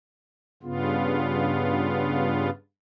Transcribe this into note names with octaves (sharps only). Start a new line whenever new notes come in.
G2 C#3 B3 F4